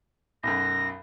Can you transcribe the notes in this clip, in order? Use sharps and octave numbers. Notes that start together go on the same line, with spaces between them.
B1 F#2 A#6